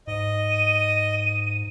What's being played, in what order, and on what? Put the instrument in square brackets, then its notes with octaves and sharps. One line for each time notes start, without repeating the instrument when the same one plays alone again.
[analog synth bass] G#2 [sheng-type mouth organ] D#5
[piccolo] D#7